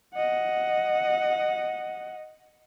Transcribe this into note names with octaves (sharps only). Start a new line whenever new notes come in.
D#5 F#5